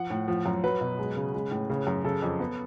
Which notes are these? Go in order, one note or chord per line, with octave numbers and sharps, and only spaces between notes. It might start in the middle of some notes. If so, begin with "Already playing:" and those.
Already playing: F3 F#5
A2
F3
F#2
F#3 B4
B2
G#3
C#3
G#3
A2
C#3
F#2
C#3 A4
F2
B3